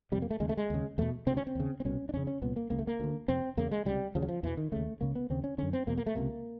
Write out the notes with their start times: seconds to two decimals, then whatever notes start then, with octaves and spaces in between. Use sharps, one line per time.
0.12 C3 G3
0.16 F2
0.22 A#3
0.31 A3
0.40 D#2 C#3 G#3
0.49 A3
0.57 G#3
0.70 D#2 C#3
0.98 E2 B2 A3
1.27 D2 C3 C4
1.37 C#4
1.47 C4
1.55 D#2 C#3
1.80 C4
1.85 C2 B2 C#4
2.09 D4
2.14 F2 C#3 C#4
2.27 C#4
2.42 C2 A#2 B3
2.56 A#3
2.70 C#2 C#3 A#3
2.79 A3
2.87 A#3
3.00 D2 D3
3.28 F2 C3 C4
3.57 E2 C#3 A#3
3.71 G#3
3.85 C#2 C3 G3
4.15 D#2 C#3 F3
4.22 F#3
4.28 F3
4.43 E2 B2 E3
4.57 D#3
4.72 D#2 C#3 A3
5.01 C#2 C#3 A#3
5.15 B3
5.30 D#2 C#3 C4
5.44 C#4
5.58 F#2 D3 C#4
5.73 C4
5.87 E2 B2 A#3
5.97 A#3
6.06 A3
6.15 C#2 C3 A#3